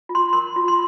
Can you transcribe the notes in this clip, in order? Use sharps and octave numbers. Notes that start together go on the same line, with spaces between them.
F4
C6
A#4 C6
F4
C6